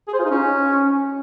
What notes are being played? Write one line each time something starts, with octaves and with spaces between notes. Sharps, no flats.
G#4
C5
F4
D#4
C#4